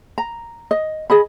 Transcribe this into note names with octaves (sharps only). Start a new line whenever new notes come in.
A#5
D#5
G#4 D#5 B5